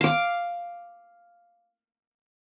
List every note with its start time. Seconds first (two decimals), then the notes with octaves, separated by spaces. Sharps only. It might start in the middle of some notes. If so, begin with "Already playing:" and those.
0.01 F5 D6